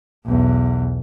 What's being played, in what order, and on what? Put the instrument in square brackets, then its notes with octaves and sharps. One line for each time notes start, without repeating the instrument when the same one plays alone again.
[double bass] B1 E2